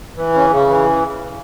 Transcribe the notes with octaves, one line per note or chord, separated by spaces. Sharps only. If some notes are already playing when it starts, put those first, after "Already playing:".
E3
C#3
C#3
E3